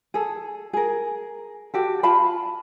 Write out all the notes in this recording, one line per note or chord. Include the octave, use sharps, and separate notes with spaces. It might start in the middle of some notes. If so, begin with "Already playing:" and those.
G#4 A4
G#4 A#4
F#4 G4 A4
F4 F5 A5 B5